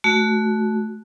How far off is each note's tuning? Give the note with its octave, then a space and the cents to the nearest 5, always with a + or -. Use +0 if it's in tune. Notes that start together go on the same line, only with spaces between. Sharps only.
A3 -20 F#4 +0